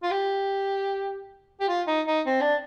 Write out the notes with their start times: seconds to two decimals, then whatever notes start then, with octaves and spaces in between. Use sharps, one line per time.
0.03 F4
0.11 G4
1.60 G4
1.68 F4
1.87 D#4
2.07 D#4
2.26 C4
2.41 D4